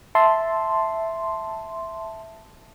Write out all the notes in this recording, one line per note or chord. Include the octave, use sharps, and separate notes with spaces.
E5 A5 C6